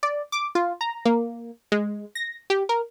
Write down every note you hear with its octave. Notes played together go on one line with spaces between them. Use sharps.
D5
D6
F4
A#5
A#3
G#3
A#6
G4
A#4